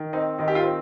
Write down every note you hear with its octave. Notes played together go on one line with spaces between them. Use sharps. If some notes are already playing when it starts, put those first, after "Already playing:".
Already playing: D#3
C4 D#4
D#3 D#4
G4
F4
C4